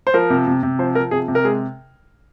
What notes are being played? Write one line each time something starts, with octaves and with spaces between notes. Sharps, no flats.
C5
F3 A#4
C3
C3
C3
F3 C5
F3 A#4
C3 G#4
C3
A#4
G#3 G#4